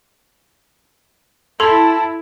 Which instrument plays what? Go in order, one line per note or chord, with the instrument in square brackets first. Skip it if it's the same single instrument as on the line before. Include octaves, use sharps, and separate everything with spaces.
[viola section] E4 [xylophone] A4 [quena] A5 [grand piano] C6 G#6 F7